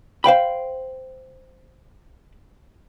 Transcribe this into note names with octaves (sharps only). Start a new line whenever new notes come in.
C5 F5 G5 B5